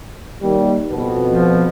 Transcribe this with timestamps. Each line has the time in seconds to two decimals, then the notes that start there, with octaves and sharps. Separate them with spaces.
0.42 D#2 G3
0.91 F2 B2 B3
1.27 F3